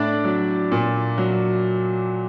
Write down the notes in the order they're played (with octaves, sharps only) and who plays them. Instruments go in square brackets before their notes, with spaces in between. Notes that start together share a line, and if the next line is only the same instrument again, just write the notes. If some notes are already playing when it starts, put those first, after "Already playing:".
Already playing: [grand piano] A2 D4 D5
F#3
A#2
F#3